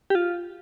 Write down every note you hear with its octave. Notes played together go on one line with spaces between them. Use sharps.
G4
F4